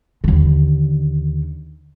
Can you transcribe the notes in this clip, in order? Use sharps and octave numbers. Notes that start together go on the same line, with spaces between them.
D#2 D3